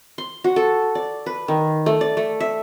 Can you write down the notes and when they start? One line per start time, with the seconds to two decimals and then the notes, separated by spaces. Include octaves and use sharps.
0.18 C6
0.44 F#4
0.56 A4
0.95 D5
1.26 B4
1.48 D#3
1.86 A3
2.01 D5
2.17 A3
2.40 E5